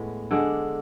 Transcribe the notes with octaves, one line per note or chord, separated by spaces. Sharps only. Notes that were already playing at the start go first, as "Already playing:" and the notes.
Already playing: A2 G#3 B3
D3 G#3 D4 G#4